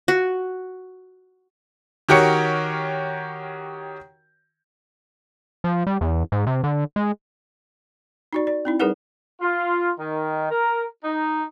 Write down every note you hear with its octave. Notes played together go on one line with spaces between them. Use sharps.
F#4
D#3 F#4 G4 A#4 C#5 C#7
F3
G3
E2
G#2
C3
D3
G#3
D#4 F#4 D5
D5
C4 D#4 E4
G3 D#4 G#4 A#4 B4 F#5
F4
D#3
A#4
D#4